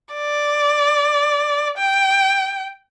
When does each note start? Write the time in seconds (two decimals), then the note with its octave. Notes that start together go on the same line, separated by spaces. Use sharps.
0.14 D5
1.78 G5